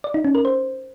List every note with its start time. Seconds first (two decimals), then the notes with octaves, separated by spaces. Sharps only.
0.04 D5
0.14 D#4
0.25 C#4
0.35 A#4
0.45 C5